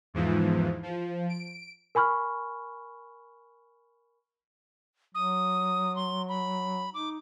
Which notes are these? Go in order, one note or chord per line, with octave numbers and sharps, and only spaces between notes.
E2 G#2 E3 F3
F3
D7
A#4 G#5 B5 C#6 F6
F#3 D#6
C6
B5
D#4 D6